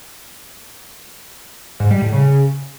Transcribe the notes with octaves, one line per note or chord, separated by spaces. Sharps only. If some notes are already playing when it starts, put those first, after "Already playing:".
G#2
G3
A2
C#3